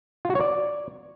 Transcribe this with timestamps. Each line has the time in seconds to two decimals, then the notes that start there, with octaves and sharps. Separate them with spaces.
0.25 F4
0.30 F#4
0.35 C#5
0.40 D5